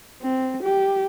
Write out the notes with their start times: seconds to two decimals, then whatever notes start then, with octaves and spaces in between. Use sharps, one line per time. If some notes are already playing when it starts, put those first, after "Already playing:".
0.23 C4
0.64 G4